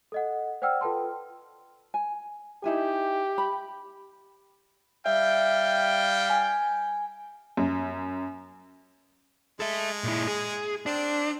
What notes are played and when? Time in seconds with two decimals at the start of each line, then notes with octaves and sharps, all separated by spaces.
0.12 A4 D#5 F#5
0.62 C5 D5 F#5 G5 E6 F6
0.81 F4 A4 B4 G5 A5 C6
1.94 G#5
2.64 D#4 E4 G4 G#5
3.38 B5
5.06 G3 E5 F5 G5
6.30 G#5
7.57 F#2
9.60 G#3 A4 E5
10.04 A#2 E4
10.28 G#4
10.86 C4 D4